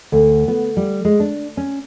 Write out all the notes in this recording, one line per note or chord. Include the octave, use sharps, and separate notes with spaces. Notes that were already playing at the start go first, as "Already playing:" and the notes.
D2
B3
G3
G#3
D4
C#4